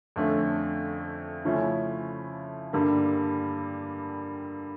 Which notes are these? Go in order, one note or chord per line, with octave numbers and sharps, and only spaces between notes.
F2 D3 A3 C#4
C#3 F3 A3 C#4 E4
G2 D3 G3 A#3